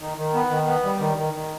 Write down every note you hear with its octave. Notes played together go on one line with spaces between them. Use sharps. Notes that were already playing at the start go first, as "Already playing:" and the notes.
D#3
D#3
B3
D#3
B3
G3
D#3
D#3
D#3